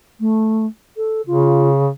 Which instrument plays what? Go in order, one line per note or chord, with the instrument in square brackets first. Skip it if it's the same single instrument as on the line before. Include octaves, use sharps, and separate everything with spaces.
[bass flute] A3
A4
[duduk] C#3 [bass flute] F4